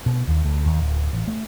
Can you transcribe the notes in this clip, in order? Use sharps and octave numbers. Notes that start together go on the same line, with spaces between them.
B2
D#2
D2
D#2
D1
A1
A3